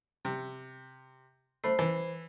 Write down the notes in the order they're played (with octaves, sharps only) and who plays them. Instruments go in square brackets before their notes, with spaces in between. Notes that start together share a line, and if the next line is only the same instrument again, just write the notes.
[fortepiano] C3
[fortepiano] A3 [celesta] C5 B5 C7
[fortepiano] E3